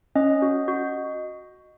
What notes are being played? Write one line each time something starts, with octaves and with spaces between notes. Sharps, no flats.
C#4 D#5
F#4
F#4